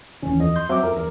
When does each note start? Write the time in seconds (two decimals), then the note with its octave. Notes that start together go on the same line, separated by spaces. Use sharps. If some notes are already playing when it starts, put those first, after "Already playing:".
0.23 F1 D#2 E3 C#4
0.40 F2 D#5
0.56 C6 G6
0.69 F#3 C4 E5 D6
0.83 F2 A#4
0.97 E2